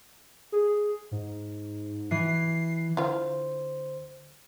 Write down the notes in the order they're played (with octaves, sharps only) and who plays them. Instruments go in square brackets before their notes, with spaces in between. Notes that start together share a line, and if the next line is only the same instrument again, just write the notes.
[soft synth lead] G#4
G#2
[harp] E3 [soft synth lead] C7
[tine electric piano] D3 C5 [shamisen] E4 F4